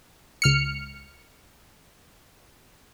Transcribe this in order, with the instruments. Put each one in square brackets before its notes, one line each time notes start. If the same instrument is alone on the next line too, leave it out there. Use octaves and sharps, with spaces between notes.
[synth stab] C#2 F6 C#7